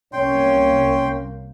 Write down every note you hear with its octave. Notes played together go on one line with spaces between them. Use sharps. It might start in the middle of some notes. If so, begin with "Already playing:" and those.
C2 A#3 C#4 C#5 G5 C6